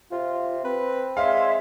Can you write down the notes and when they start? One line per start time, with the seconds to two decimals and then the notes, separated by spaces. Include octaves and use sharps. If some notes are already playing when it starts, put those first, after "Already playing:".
0.11 C3 F4
0.65 C4 B4
1.17 G#3 C#5 E5 F5 C6